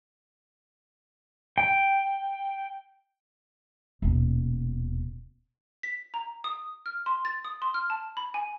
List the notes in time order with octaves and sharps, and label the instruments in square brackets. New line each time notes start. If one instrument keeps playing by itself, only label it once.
[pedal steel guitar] G5
[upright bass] D#1 B2
[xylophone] B6
A#5
D#6
F6
C6
A6
D#6
C6
F6
A5
B5
G#5